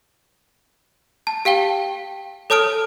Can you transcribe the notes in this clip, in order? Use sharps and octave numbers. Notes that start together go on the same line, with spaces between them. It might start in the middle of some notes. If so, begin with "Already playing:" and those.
A5
G4 F5 G5 G7
A4 C#5 A5 D#6 F6 D7